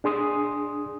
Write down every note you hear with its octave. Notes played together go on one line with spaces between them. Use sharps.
D4 G#4 C6 D#6